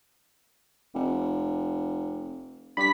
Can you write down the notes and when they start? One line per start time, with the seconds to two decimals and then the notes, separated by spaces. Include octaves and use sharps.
0.95 F1
2.77 G2 B5 B6